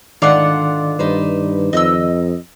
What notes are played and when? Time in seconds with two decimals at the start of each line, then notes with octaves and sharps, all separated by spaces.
0.22 G#2 D3 D#3 D4 F4 D5 F#5 D6
0.99 G2 D#4 B4 C5
1.73 F2 D#5 E6